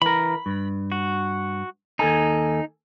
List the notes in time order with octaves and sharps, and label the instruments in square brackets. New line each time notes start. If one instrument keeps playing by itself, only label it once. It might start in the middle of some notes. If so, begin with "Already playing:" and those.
[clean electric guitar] E3 A#4 [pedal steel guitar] B5
[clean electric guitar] G2
[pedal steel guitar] F#4
[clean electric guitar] D#2 A4 G#5 [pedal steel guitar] D#4